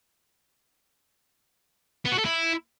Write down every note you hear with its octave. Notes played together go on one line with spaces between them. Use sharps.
B3
F#4
A4
E4